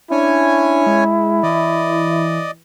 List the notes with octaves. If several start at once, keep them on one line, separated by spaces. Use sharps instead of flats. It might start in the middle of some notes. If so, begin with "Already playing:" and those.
C#4 D4 E4 C#5 G#5
G#3
E3 D5 D#5